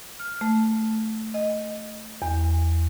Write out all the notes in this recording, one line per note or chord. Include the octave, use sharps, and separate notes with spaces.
F6
A3
D#5
E2